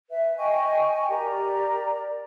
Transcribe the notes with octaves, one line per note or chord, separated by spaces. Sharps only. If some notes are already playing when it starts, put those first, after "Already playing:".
B4 E5
D#5 G5 G#5 C#6
G4 A#4 D5 A#5